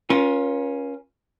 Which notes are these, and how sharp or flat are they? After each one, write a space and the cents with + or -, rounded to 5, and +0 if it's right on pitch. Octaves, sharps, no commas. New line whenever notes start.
C#4 +0 F4 +10 A#4 +45